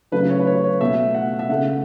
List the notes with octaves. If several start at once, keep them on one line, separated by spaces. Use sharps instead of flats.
C#3 F#3 A3 B4
C#5
B4
C#5
C#5
B2 A3 E5
F#5
E5
C#3 A3 F#5